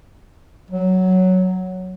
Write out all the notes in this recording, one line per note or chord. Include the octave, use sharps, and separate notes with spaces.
F#3